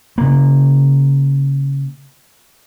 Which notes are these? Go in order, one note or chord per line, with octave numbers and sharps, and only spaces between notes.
C#3 A#3